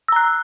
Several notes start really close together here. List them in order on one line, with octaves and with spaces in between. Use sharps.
E6 A#5 F#6